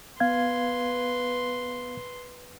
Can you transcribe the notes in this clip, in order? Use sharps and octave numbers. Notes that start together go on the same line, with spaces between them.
B3 B4 F5 C6 G#6